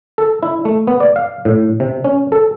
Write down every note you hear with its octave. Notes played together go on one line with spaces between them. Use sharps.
A4
E4
A3
B3
D5
F5
A2
C3
C#4
A4